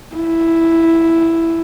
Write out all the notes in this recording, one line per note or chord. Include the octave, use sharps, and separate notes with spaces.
E4